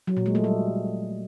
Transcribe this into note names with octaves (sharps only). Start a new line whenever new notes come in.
F#3
A#2
G#3
A3
G3